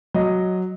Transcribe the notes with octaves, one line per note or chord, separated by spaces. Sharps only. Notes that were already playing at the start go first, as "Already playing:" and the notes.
F#3 D#5